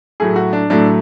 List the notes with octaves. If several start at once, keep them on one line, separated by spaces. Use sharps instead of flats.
A2 F#3 A3 G#4
F#4
D4
A2 F#3 A3 D4